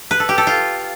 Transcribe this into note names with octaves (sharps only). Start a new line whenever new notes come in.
B4
A4
G4
A4
F4